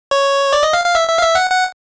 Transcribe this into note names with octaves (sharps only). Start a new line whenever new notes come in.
C#5
D5
D#5
F5
F5
E5
E5
F5
E5
F#5
F#5